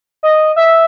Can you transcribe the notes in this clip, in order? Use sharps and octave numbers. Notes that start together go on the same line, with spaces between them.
D#5
E5